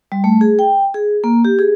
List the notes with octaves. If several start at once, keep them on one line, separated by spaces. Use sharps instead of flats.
G3
A3
G#4
G5
G#4
A#3
G4
G#4